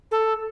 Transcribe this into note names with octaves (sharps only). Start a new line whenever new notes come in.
A4